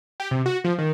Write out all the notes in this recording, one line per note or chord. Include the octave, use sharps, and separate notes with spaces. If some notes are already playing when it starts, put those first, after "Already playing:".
G4
C3
F#4
F3
D#3